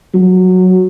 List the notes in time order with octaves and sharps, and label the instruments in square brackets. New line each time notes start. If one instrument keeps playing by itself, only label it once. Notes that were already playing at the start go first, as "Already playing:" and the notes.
[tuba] F#3